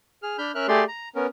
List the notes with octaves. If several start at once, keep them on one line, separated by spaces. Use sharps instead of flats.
G#4 F6
D4 B5 F6 G6
C#4 A#4 E5 F6 F#6
A3 G4 G#4 D5 C6
A#5
B3 C#4 A#4